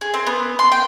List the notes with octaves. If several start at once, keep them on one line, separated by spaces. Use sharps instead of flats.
G#4
C4
B3
C6
G5